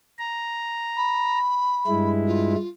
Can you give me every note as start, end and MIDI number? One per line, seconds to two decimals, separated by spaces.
0.19 1.39 82
0.97 2.10 83
1.87 2.55 43
1.87 2.55 56
1.87 2.55 64
2.26 2.68 65